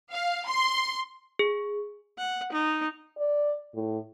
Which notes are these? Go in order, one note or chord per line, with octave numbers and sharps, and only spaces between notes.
F5
C6
G#4
F#5
D#4
D5
A2